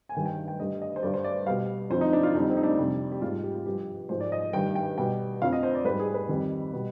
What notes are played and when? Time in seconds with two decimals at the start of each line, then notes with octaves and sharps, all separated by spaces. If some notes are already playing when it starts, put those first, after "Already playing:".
0.09 G#5
0.15 G2 D#3 G3 G5
0.26 G5
0.48 G5
0.59 G2 D3 G3 D#5
0.82 D#5
0.96 C5
1.02 G2 D3 G3 D5
1.14 C5
1.24 D5
1.46 B2 G3 F5
1.90 F2 D3 F3 C5
2.01 D#4
2.13 D4
2.23 F4
2.35 F2 D3 G3 D#4
2.50 C4
2.57 D#4
2.63 D4
2.78 F2 C3 G3
3.11 G4
3.22 G#2 G3 F4
3.44 G4
3.55 F4
3.66 G2 F3 G4
4.09 G#2 F3 C5
4.21 D5
4.32 D#5
4.53 G2 D#3 G3 G5
4.75 G5
4.98 B2 G3 G5
5.42 F2 D3 F3 F5
5.53 D#5
5.63 C5
5.75 D5
5.84 G#2 G3 B4
6.00 G#4
6.14 B4
6.29 F2 D#3 G3
6.73 B2 G3